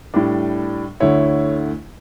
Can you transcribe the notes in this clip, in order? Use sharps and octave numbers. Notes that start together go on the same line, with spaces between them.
A2 G3 D4
D2 D3 A3 E4 C#5